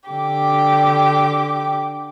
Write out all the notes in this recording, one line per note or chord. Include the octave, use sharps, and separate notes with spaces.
D3 G4 D6